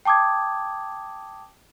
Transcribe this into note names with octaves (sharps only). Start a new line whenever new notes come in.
G5 A5 D6 D#6 G#6